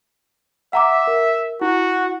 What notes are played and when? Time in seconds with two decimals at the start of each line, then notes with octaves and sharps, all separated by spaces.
0.73 E5 F#5 A#5 D6
1.07 A#4
1.61 E4 F#4